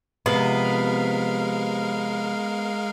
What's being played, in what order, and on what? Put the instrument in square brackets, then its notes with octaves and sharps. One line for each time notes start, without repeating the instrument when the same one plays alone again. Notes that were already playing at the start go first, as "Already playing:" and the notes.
[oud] C3 F3 [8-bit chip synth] G#3 A#4 F5 [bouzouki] B3